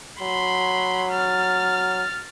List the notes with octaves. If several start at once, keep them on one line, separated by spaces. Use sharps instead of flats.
F#3 B5 C6
F6 A6